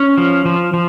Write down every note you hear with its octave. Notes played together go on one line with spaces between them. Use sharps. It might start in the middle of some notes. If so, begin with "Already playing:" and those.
Already playing: C#4
F3
F3
F3